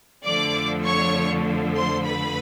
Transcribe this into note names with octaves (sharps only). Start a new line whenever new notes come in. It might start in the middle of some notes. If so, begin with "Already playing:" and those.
F2 D3 F3 A3 D5 D6
C#5 C#6
C5 C6
B4 B5